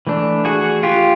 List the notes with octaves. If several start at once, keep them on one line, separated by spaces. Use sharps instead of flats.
E3 A3 D4
F#4 G#4
F4 G4